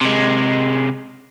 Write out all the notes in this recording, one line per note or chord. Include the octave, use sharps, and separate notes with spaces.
C3 G#3